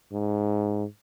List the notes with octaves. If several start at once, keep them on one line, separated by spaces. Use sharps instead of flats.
G#2